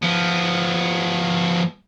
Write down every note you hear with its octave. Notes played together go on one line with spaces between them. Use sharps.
F3 B3